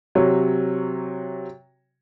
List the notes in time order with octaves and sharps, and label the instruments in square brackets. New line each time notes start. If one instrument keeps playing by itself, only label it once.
[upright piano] C3 F#3 C#5